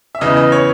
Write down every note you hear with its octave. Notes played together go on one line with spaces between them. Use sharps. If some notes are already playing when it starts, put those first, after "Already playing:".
E5
E2 C#3 E3 D#5
D#5
C#5